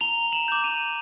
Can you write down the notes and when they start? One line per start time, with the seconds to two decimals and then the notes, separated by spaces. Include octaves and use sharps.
0.01 A#5 F7 G7
0.32 E7 F#7
0.48 D6 G6
0.64 D#7 F7